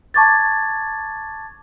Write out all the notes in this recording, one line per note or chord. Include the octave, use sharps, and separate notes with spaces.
A5 C#6 D6 G#6 A6